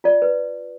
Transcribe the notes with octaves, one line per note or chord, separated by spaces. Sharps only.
F4 D5
B4